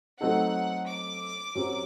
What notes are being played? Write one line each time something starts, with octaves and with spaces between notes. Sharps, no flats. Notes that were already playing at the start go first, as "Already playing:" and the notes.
F#3 A3 C4 D#4 A4 F#5
D6
F#2 F#3 C4 G4 C5